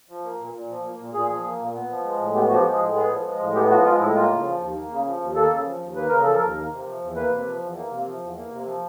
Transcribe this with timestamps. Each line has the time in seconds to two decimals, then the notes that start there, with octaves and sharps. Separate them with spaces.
0.09 F3
0.24 A#3
0.39 A#2
0.54 A#2
0.69 F3
0.84 A#3
0.99 A#2
1.14 A#2 G#4
1.29 F3
1.44 A#3
1.60 A#2
1.75 B3
1.90 F3
2.05 G#3
2.19 A2
2.34 B3 G4
2.48 F3 F#4
2.55 G4
2.64 G#3
2.75 G#4
2.80 A2
2.95 B3 G#4
3.10 F3
3.25 G#3
3.40 A2
3.55 B3 G4
3.70 F3 F#4
3.85 G#3 F4
4.00 A2 E4
4.15 A#3 F4
4.30 C#3
4.45 F3
4.60 D#2
4.75 A#3
4.90 C#3
5.06 F3
5.20 D#2
5.35 A#3 A4
5.50 C#3
5.65 F3
5.80 D#2
5.95 A#3 B4
6.09 C#3 A#4
6.22 F3 A4
6.34 A#4
6.41 D#2
6.56 A#3
6.70 C3
6.86 F3
7.01 E2
7.16 A#3 B4
7.31 C3
7.46 F3
7.61 E2
7.76 A#3
7.91 C3
8.06 F3
8.21 E2
8.36 A#3
8.51 C3
8.66 F3